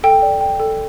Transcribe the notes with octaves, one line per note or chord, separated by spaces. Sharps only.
A4 G5
D5
G5
A4